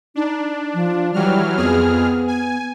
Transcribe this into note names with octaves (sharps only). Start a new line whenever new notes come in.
D4 D#4
F3
E3 F#3 G3 F6
F2 B3 G#4 F6
G#5